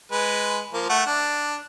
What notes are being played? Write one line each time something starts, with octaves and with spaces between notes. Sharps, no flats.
G#3 B4
F3 A#3
A3 F#5
D4